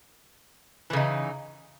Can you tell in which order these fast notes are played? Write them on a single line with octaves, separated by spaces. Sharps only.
E3 C#3 D#4